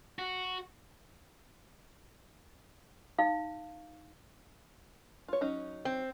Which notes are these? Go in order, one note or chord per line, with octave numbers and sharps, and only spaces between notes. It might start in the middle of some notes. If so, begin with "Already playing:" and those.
F#4
D#4 F5
F4 C#5
F#3 C#4 D#4
C4